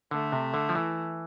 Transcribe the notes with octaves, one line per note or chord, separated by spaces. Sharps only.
D3 A3
C3
D3
F3
E3